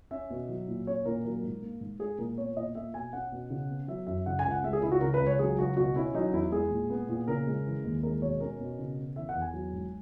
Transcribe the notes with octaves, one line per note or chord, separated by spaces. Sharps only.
C#4 E5
B2
F#3
A#2
C#4 C#5
A#2 A#4
F#3 A#4
G#2
A#3
G#2
G#3 G#4
A#2 A#4
B3 C#5
A#2 D#5
A#3 E5
B2 G#5
C#4 F#5
B2
C#3
B3
F#3 E5
F#2 E5
C#3 F#5
G#5
C#2
F#5
G#3 E5
G#4
C#2 E4
F#4
C#3 A#4
B4
C#2
C#5
F#3 G#4
C#2 F#4
B2 F#4
C#4 E4
F#3 D#4
E2 E4
G#3 G#4
A#2
B3
A#2
C#3 A#4
G#3
E3
D#2
G#3 A#4
B2 C#5
C#4 A#4
B2
C#3
B3
E3 E5
F#5
E2
G#5
F#3
G#2